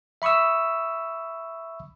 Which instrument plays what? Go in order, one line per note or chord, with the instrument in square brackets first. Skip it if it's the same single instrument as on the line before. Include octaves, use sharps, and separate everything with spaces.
[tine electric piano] E5 B5 C#6 D#6 E6